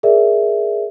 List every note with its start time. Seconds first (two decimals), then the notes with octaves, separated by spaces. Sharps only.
0.03 G#4 A#4 D5 E5